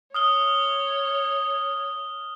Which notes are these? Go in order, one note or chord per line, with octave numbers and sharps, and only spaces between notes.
C#5 D#6 F6 G7